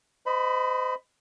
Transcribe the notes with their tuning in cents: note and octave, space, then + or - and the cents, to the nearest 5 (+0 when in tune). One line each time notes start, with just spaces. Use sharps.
C5 -35 D#5 -5 B5 +15